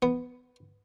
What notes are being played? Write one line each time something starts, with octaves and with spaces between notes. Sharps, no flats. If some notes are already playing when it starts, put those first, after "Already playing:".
B3